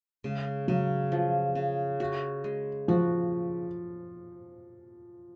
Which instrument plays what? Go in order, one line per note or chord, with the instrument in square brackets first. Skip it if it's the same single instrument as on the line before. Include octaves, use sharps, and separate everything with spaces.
[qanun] C#3 [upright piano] G#3
[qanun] C#3 [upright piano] F#3
[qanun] F3
C#3
F#4
G#3
[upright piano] F3 [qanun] F#4